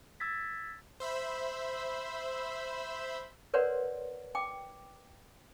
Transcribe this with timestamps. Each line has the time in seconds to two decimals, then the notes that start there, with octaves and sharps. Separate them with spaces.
0.20 E6 G#6 A6 B6
1.00 C5 E5 B5 E6
3.54 A#4 B4 C#5 D5 F#5 C6
4.35 G5 D6